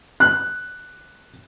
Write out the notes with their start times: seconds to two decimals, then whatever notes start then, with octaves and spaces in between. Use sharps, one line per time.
0.20 F#6